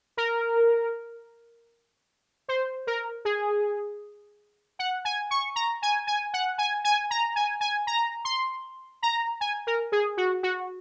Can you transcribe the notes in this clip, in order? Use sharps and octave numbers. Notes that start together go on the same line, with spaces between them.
A#4
C5
A#4
G#4
F#5
G#5
C#6
A#5
G#5
G#5
F#5
G#5
G#5
A#5
G#5
G#5
A#5
C6
A#5
G#5
A#4
G#4
F#4
F#4